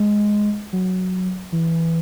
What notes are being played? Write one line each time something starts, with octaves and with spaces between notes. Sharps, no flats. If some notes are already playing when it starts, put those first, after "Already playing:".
Already playing: G#3
F#3
E3